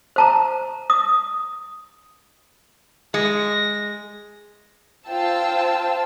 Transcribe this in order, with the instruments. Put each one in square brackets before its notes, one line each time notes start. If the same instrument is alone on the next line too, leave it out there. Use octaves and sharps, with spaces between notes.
[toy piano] C5 A5 A#5
D#6
[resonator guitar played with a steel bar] G#3 [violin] A#6
[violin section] F4 C5 G5 A5 E6